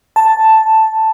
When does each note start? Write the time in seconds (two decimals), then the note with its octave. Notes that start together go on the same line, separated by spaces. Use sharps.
0.16 A5